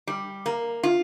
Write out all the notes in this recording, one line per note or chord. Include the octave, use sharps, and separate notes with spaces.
G3
A#3
F4